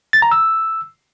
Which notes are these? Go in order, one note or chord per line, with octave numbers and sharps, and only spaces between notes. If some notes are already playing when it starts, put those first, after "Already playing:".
A6
A#5
E6